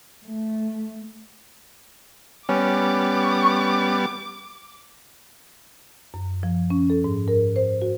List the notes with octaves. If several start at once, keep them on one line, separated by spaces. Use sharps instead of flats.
A3
G3 B3 C#4 D6
F#2
F3
C#4
A4
G#2
A#4
C5
F#4